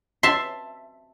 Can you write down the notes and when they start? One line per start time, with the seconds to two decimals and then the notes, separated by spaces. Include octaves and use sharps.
0.23 E5 A5 C6